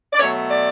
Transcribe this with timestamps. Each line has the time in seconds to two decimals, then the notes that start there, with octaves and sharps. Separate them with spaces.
0.13 D5
0.19 B2 F#3 A3 C#5
0.51 D5